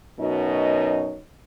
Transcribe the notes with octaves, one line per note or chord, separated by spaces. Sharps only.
F#2 B2 D#4 C#5